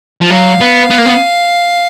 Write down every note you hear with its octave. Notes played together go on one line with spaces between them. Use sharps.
F3
F#3 F5
B3
B3
A#3
B3